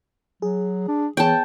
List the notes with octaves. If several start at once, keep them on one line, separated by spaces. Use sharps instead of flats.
F#3 G#4
D4
E3 B3 G#4 C#5 G5 A5